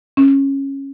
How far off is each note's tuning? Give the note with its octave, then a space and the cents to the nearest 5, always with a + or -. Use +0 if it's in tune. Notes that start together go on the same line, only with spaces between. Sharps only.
C#4 -15